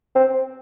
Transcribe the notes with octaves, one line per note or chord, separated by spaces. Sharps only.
C4